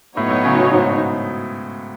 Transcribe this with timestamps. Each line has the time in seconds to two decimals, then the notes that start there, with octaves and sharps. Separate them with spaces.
0.16 A2 F#3 B3 D#4 F#4 C#5
0.30 A2
0.45 C#3
0.59 B2
0.73 G#2